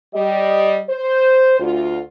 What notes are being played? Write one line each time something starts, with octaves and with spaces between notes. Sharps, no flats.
G3 D#5
C5
D2 F4